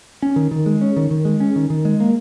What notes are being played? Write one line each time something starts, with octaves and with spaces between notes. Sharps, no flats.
C#4
D#3
D#3
G#3
C#4
D#3
D#3
G#3
C#4
D#3
D#3
G#3
A#3